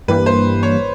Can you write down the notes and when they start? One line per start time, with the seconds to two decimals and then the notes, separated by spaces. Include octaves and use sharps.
0.08 G2 E3 G3 A#3 B4
0.26 C5
0.63 C#5